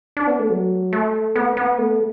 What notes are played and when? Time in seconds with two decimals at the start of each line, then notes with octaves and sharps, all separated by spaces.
0.17 D4
0.27 B3
0.39 A3
0.50 F#3
0.93 A3
1.36 B3
1.57 B3
1.78 A3